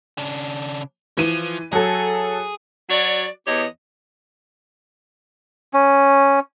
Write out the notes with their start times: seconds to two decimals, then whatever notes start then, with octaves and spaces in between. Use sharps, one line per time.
0.18 C#3 D4
1.17 E3 F3 D#7
1.73 F#3 G#4 A4
2.90 F#3 F#4 C#5 D5
3.47 E2 B3 G4 C#5 D#5
5.74 C#4